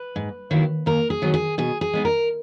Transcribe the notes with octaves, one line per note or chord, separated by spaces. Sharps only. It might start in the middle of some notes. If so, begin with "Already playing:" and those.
Already playing: B4
G#2
D#3 F#3 A#3 E4
D#2 A#4
G#4
D#3 F#3 B3
G#4
B2 G#4
G#4
G#3 B3 D#4
A#4